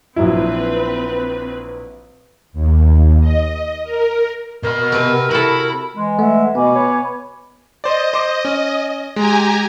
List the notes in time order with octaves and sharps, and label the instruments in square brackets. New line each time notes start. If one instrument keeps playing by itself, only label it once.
[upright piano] A#1 F#3 E4 [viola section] C4 B4
[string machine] D#2
D#5
A#4
[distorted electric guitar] B2 B5 [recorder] A#4
[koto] C3 C4 [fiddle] B4
[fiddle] E4 [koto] F#4 A4 [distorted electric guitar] B5
[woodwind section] E3 G#3
[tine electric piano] A3 [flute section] E5 F#5
[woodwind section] B2 [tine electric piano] B3 [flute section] G#5 B5 D6
[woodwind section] B4 C#5
[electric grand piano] C5 D5 [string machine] D#5
[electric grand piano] C5 D6
C#4
[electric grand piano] G#3 [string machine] G4 G#5 A#5